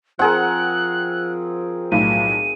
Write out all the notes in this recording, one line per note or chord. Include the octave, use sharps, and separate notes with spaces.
F3 C4 G#4 A#4 F#5 F#6
B1 A2 D#7